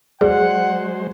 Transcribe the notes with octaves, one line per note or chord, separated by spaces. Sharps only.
F#3 G#3 G#4 C5 D5 F#5